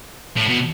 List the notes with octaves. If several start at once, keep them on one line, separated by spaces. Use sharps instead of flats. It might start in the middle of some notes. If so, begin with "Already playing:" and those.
A2
B2